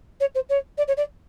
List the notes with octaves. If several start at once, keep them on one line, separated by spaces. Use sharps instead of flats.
C#5
C5
C#5
D5
C#5
D5